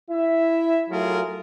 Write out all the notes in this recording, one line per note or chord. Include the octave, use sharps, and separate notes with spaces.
E4 E5
F#3 A3 F4 G#4 A#4